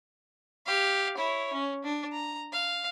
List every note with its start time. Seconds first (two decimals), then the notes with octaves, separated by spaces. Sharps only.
0.66 G4 F5
1.17 E4 C#5
1.53 C#4
1.84 D4
2.13 A#5
2.52 F5